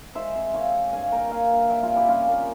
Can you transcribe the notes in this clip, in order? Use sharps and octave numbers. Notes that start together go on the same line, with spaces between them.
G#3 C5 E5
C3
G#3 C#5 F5
G#3
G2 F5 G#5
A#3 G5 A#5
A#3 F5 G#5
G2
G3 E5 G5
F4 G#4
C3
E4 G4
G3 C#4 F4
A#3